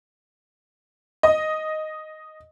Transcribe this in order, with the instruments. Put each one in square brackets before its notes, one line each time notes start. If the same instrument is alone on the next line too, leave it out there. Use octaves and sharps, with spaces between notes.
[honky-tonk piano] D#5